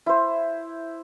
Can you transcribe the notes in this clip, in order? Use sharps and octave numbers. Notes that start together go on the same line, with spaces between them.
E4 C5